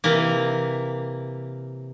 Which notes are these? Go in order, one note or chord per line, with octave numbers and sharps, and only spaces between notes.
C3 E3 A#3